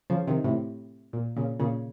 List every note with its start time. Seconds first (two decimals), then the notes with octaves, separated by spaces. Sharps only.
0.10 C#3 F3
0.27 C3 D#3
0.44 A2 C3
1.13 A#2
1.37 A#2 C#3
1.59 A#2 C#3